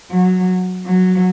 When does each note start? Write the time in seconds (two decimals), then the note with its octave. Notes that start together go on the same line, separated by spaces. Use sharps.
0.11 F#3
0.85 F#3